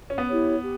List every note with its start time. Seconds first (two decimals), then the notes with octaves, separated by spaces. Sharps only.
0.10 C#4
0.18 B3
0.27 E4 G4 C#5
0.62 G4